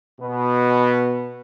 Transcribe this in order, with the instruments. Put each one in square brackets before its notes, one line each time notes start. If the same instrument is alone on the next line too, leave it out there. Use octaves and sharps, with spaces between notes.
[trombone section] B2 B3